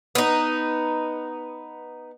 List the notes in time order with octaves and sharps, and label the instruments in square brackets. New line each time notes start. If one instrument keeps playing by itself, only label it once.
[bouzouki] B3 D#4